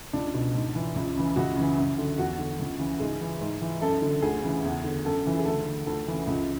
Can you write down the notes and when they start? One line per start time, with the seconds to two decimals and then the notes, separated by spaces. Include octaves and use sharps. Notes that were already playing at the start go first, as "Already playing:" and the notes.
0.13 C#2 D4
0.34 B2
0.54 G#2
0.75 E3
0.95 C#2
1.16 C#3 E3
1.36 C#2 F#4
1.56 C#3 E3
1.78 F#2
1.98 D3
2.18 E2 F#4
2.39 D3
2.59 C#2
2.79 C#3 E3
3.00 G#2 G#4
3.21 E3
3.41 G#2
3.62 E3
3.81 F#2 A4
4.02 D3
4.22 D2 G#4
4.43 C#3 E3
4.64 E2
4.84 D3
5.05 F#2 A4
5.25 C#3 E3
5.39 G#4
5.45 D2 A4
5.66 D3
5.86 D2 A4
6.08 C#3 E3
6.27 C#2